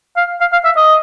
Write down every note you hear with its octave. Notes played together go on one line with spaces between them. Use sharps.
F5
F5
F5
E5
D#5